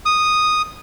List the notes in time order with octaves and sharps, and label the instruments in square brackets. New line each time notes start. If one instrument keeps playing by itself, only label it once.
[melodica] D#6